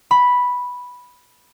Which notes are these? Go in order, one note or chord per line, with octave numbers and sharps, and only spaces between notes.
B5